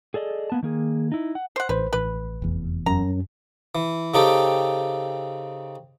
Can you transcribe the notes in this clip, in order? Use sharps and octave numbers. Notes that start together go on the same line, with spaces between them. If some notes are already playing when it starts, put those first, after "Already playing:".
G#4 A4 D5 D#5
A#3 B3 A5
D#3 A#3 G#4
D#4 E4
F#5
C5 F#5
A1 B4 C5
A1 B4
F1 E2
F#2 A#5
E3
C#3 C4 D#4 G4 A4